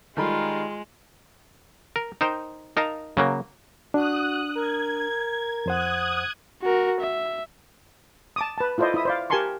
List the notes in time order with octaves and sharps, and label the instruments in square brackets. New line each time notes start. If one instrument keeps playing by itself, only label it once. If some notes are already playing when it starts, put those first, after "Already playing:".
[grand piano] D#3 A#4 B5 [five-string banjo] G3 D#4 A4 [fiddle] G#3 [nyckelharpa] F4
[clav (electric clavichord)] A#4
D#4 A#4 C5 G5
D#4 A#4 D#5 F5 A5 A#5
C#3 F#3 A#3
[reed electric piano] D4 [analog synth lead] F#4 [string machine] D#6 F#6
[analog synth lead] A#4 [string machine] G#6
[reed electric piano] F2 C5 F#5 [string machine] D#6 F#6 G#6
[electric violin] F#4 A#4
E5
[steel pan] A5 D6 D#6
B4 A5
E4 F4 A4 C5 D5 D#5
E4 E5 D#6
C5 D5 F5
G4 A#4 G#5 A5 C6 C#6